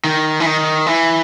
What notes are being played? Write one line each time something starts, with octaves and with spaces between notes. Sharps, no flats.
D#3
E3
D#3
E3